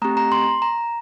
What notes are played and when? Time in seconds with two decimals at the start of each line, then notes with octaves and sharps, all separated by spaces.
0.02 A3 C4 G4 A#5
0.17 A#5
0.32 C6
0.62 A#5